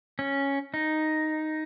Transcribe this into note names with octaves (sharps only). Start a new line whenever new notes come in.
C#4
D#4